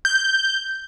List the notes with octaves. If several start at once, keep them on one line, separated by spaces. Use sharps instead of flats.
G6